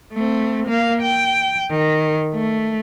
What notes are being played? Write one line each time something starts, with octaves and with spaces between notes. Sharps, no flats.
A3 C4
A#3 F5
G5
D#3
A3